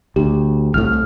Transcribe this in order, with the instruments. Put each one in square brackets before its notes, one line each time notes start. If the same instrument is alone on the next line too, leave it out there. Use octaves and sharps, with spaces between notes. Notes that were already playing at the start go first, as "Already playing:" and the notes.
[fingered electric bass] D2 [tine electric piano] G4
[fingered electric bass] C2 A2 [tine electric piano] F6